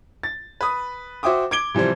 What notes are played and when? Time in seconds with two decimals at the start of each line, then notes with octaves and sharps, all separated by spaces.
0.23 A6
0.61 B4 D#6
1.23 F#4 C5 E5 G5 D6 D#6
1.51 D6 G#6 D7 G7
1.75 C3 E3 F3 G3 C5